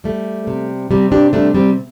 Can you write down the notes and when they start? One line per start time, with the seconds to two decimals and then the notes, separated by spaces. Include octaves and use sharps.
0.04 G3 A3
0.47 C3
0.91 C3 G3 C4
1.12 D4 G4
1.33 G3 A3 D4
1.54 G3 C4